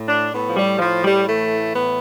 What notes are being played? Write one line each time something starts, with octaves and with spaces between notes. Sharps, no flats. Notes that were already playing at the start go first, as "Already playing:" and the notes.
Already playing: A2
D4
A2 B3
F3
G3
A2 F3
G3
E3 A3
A2 B3